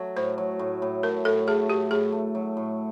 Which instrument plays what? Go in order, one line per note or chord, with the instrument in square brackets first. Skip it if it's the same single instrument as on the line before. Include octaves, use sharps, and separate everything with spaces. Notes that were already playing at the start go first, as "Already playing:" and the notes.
Already playing: [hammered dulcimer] F#3 A3
[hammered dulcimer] A2 [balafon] C5
[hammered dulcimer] F#3
A2
A2
[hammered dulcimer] A3 [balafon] A#4
[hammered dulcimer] A2 [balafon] A4
[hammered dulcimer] A3 [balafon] G#4
[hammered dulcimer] A2 [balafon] G4
[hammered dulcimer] A2 [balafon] G#4
[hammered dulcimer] A3
F#3
A2